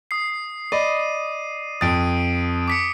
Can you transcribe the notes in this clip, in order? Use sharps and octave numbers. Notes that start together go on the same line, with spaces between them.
D#6 C7
D5 D#5 B5 D#7
F2 D#6 A6 D7
D6 B6 C#7